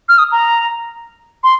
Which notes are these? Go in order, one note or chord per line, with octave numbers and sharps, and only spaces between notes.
F6
D#6
A#5
C6